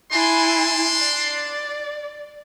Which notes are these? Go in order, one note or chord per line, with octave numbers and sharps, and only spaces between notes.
D4 E4 G#5 C6
D5